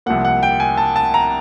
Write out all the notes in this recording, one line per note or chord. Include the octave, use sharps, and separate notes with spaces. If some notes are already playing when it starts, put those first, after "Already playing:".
C2 C3 F3 A#3 F#5
F#5
G5
G#5
A5
A5
A#5